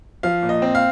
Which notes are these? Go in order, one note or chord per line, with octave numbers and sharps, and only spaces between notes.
F3 F5
A#2
D#5
C4
F5